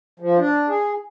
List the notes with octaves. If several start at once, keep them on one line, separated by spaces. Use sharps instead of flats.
F3
D4
G#4